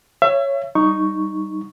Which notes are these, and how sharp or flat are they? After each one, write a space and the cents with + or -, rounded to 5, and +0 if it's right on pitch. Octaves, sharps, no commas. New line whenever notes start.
C#5 +0 E5 +35
G3 -15 D#4 +0 C#6 +0